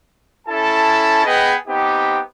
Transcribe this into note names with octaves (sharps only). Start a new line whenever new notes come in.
C#4 E4 A4 A5
B3 G#4 B4 D#5 G5
B3 C4 D#4 G4